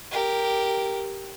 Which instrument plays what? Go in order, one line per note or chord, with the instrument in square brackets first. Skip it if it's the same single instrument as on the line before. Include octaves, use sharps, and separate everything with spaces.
[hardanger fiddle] G4 A#4